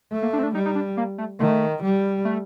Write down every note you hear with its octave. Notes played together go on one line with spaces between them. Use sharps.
A3
A#3
D4
C4
D4
G3 D#4
D#4
D4
A#3
A3
D#3 A3
G3
A3